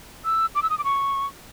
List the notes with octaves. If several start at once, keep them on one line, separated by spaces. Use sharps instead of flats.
E6
D6
E6
D#6
D6
C#6